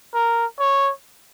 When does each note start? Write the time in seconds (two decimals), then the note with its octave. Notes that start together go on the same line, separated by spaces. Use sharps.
0.14 A#4
0.60 C#5